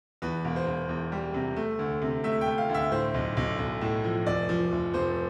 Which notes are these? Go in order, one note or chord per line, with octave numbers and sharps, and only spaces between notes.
E2 B4
E1
C5
E1
E2
G3
C3
A3
D2
C3
A3 E5
G5
A3
F5
D2 E5
A2 C5
B1
B1
B1
A2
F3
F1 D5
F3
F1
F1 C5